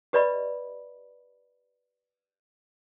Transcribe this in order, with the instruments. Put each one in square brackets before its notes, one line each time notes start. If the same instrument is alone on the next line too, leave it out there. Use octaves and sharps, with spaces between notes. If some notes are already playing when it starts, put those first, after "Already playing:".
[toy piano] G4 B4 D5 D#5 B5